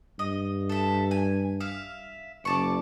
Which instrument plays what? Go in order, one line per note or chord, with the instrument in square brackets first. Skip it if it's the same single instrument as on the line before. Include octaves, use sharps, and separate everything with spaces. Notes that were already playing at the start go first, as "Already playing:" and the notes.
[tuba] G2 [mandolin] D#5
[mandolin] A4 E5
G#5
E5 F5
[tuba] F#1 [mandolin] D5 A5 C#6